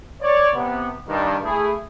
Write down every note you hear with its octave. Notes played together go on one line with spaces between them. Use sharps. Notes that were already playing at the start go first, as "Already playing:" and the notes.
C#5 D5
C3 B3
G2 D#3
A3 E4 G#4